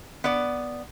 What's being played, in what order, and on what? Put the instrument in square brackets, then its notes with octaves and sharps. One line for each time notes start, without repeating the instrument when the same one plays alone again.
[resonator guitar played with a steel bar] B3 D5